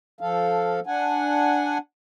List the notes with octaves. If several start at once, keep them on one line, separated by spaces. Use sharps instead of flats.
F3 A4 F5
D4 F#5 G#5